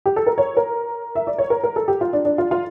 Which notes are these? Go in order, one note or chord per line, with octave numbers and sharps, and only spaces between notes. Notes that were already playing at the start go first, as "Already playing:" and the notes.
G4
A4
A#4
C#5
A#4
E5
D5
C#5
A#4
A#4
A4
G4
F4
D4
D4
F4
F4